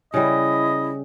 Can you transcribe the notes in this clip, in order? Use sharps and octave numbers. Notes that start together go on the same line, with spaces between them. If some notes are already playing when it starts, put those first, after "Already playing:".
C#3 G3 E4 D#5